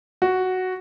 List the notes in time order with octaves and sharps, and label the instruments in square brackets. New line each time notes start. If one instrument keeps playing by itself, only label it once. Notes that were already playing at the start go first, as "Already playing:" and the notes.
[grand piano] F#4